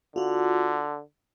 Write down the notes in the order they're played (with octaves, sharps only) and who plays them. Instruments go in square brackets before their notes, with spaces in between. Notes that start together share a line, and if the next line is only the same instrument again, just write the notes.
[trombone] D3 [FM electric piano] F4 F#4